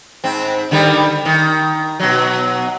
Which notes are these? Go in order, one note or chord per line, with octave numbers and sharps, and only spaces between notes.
G#2 C4
D3 D#3 G3
D#3
B2 F#3